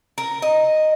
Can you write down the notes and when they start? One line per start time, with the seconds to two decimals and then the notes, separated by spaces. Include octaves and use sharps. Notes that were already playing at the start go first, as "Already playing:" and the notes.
0.18 A#4
0.42 D#5